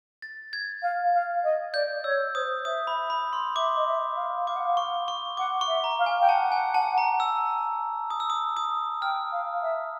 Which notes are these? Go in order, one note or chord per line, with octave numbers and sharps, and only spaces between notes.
A6
G#6
F5
F5
D#5
D5 G6
C#5 E6
C5 D#6
E5 D#6
B5
B5
C6
E5 D6
D#5
E5
E5
F5
F5 D6
F#5
F5
C#6
C#6
F#5 D6
C#6
E5
A#5
F5
G#5
G5
F#5 A5
G#5
A5
A#5
E6
D#6
E6
D#6
D#6
G5 F6
F5
E5